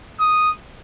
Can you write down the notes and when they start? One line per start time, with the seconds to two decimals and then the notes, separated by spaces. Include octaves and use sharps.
0.20 D#6